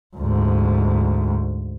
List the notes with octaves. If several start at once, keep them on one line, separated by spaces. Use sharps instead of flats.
D2 G#2